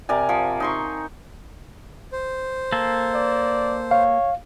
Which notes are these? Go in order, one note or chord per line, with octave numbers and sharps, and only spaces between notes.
C3 A#4 D5 G#5
F3
D#4 C6 C#6
C5
A#3 A4
D5
C#5 F5